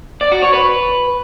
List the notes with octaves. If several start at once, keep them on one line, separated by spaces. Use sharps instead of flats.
D5
F#4
C#5
B4